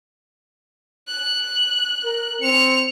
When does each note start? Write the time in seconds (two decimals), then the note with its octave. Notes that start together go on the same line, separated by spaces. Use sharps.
1.08 F#6
2.04 A#4
2.42 C4 C#7 F7